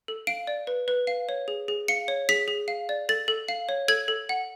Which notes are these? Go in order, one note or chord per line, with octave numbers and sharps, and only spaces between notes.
A4
F5 D7
D5
B4
B4
F5
C#5
G#4
G#4
F5 C#7
C#5
G#4 B6
G#4
F5
D5
A4 A6
A4
F5
C#5
A4 G#6
A4
F#5